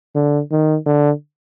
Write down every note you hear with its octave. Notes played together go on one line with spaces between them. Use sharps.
D3
D#3
D3